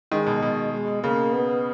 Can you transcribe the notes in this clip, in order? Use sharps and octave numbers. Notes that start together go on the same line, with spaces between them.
D#3 G#3
B2
B2 G#3
G#3
C#3 A#3
B3